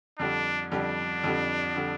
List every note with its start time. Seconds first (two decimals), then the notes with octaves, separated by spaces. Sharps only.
0.19 F2 D3 G3 D4
0.71 F2 D3 G3 D4
1.24 F2 D3 G3
1.76 D3 G3